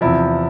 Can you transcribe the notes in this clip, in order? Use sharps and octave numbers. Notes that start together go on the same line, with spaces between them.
E2 C3 F3 E4